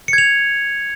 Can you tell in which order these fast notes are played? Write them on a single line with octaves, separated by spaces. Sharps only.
C#7 G#6 F7